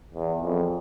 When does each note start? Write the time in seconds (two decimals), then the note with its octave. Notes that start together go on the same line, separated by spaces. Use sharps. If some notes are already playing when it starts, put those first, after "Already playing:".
0.14 E2
0.43 F2